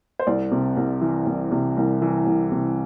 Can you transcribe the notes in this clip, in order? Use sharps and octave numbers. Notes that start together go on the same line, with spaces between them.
C5
C2 D5
C3
C2
E3
C2
C3
C2
E3
C2
C3